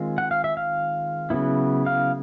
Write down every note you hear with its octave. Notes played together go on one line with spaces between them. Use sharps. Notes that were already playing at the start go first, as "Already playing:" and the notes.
Already playing: D#3 G#3 C4 F4
F#5
F5
E5
F5
C#3 F#3 B3 E4
F5